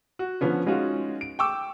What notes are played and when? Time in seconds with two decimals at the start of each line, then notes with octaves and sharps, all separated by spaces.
0.19 F#4
0.41 D3 F3 B3 C#4
0.66 G#3 C#4 D#4 F4 F#4
1.21 D7
1.39 G5 C#6 D6 E6